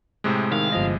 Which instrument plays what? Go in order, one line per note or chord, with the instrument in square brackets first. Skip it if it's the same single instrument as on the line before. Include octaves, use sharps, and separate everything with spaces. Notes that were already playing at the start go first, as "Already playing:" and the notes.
[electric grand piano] A2 C3 G#3
[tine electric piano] D#3 [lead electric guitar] F5
[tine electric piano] G1 F3 D#5